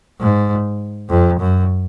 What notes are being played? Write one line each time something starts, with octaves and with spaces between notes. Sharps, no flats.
G#2
F2
F#2